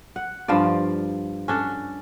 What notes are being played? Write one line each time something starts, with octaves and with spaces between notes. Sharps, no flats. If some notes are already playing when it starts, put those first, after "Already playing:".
F#5
G2 F3 F4 D5
C#4 D4 A4